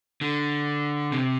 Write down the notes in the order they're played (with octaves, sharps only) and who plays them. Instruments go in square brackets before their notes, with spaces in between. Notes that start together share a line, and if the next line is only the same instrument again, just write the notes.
[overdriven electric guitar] D3
C3